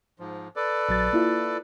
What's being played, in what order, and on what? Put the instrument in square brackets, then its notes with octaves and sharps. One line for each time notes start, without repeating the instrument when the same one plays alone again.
[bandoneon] G#2 F3
A4 B4 D5
[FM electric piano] A#1 F#3 A6
A#3 E4 F4